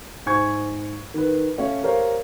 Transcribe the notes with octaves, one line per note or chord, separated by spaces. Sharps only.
G#2 C5 G#5 C#6 G#6
D#3 B4
A3 C#4 C#5 F5
G4 A#4 C5 C#5 F5